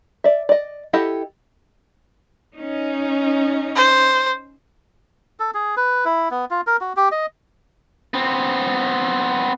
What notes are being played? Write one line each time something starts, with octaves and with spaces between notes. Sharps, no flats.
D5 E5
D5 D#5
E4 G4 A4 D#5 F#5
C#4 D#4
C5
A4
G#4
B4
E4
B3
F4
A#4
F#4
G4
D#5
B3 C4